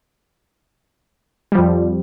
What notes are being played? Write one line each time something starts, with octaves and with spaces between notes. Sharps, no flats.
F2 F3 G3